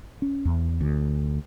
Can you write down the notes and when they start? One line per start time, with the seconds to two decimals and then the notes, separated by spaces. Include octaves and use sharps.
0.22 C#4
0.45 E2
0.81 D2